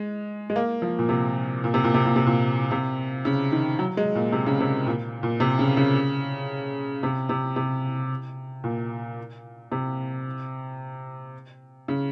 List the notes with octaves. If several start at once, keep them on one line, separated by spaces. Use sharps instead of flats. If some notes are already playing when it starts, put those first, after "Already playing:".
Already playing: G#3
G#3
A#3
F3
A#2
C3
A#2
C3
A#2
C3
A#2
C3
A#2
C3
C#3
D#3
F#3
G#3
A#2
C3
C#3
C3
A#2
A#2
C3
C#3
C#3
C3
C3
C3
A#2
C3
C#3